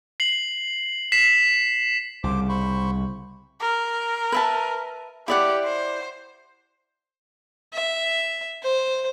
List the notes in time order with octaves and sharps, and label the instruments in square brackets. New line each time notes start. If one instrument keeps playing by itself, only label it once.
[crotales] C7 F#7
B6 C7 E7
[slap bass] C2 C#3 [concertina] C5 D6
[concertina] C5 B5 C#6
[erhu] A#4
[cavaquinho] B4 E5 A5
[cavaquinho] E4 D5 F#5 [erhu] G4
[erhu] C5
[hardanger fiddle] E5
C5